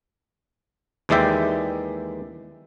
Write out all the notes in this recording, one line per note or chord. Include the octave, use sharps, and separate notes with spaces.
D#2 E3 G#3 D5 E5 G5